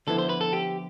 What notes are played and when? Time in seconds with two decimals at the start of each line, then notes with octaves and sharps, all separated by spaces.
0.07 D3 F3 B3 E4 A4
0.18 C5
0.29 B4
0.41 A4
0.53 G4